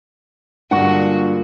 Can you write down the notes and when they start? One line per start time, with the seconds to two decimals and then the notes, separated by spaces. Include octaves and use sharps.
0.71 G2 A#2 D3 G#3 F#4 G#4 F#5 C#6